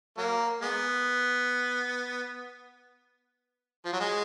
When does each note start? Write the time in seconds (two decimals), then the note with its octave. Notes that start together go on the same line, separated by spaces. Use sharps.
0.18 F#3 A#3
0.61 G#3 B3
3.85 F3
3.93 F#3
4.00 G#3